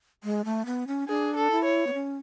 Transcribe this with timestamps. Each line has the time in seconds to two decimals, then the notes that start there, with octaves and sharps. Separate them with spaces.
0.24 G#3
0.45 A3
0.66 B3
0.87 C#4
1.08 D4 G#4
1.36 A4
1.51 E4
1.64 C#5
1.87 B3
1.94 C#4